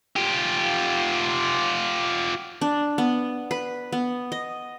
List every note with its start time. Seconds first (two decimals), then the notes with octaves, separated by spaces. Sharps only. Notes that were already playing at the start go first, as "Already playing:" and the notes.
0.16 F4 G4
2.61 D4
2.98 B3
3.51 B4
3.92 B3
4.32 D#5